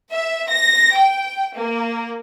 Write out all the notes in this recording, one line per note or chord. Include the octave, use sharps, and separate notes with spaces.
E5
A#6
G5
A#3